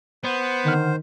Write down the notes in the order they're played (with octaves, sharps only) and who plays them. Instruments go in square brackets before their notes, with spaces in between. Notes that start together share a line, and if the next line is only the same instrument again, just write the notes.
[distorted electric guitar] B3 [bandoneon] C5
[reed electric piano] D3 F#5 F6 [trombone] D#3